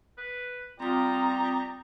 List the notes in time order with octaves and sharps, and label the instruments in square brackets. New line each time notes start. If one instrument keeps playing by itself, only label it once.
[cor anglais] B4
[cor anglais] G3 [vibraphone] C4 D#6 [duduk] F4 [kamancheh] A#5